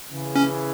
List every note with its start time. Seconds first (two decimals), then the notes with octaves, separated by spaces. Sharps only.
0.11 C#3 E3
0.36 C#4